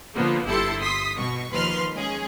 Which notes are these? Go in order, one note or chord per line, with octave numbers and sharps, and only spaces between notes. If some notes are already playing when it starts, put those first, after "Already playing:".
D3 F3 A#3 B3
G1 E4 G4 A4 C6 C#7
C6 D#6 B6
B2 C#6
D#2 F3 B4 C6 F6
G#3 C#4 G#4